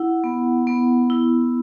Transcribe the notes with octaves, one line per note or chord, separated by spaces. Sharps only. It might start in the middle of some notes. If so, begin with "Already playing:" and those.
Already playing: E4 F#5
B3
B3
E4